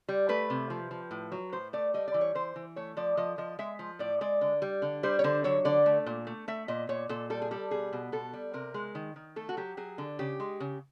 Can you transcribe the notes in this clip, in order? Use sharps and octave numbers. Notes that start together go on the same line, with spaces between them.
G3
A3 B4
C3
F3
F3
A2
F#3
A2 C5
A3 D5
G3 D#5
D5
E3
C#5
E3 C5
E3
A3 C#5
F3 D5
F3 D#5
F3 D#5
G#3 E5
F3
A2 D5
G#3 D5
D3
G3
D3
G3 C5
C#5
D3 C5
F#3 C#5
D3 D5
A3
A#2
A3
A3 E5
A#2 D#5
A#2 C#5
A#2 A4
G3 A4
G#4
G3 A4
B2 G#4
B2
B2 A4
G3
C3 A#4
G#3
D#3
D#3
A3 A4
F#4
F#3 G4
F#3 G#4
D3
C#3 G4
G#3
C#3